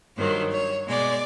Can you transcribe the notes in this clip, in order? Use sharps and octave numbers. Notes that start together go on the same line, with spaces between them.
G2 D#3 F#3 C5
C#5
B2 G#3 D5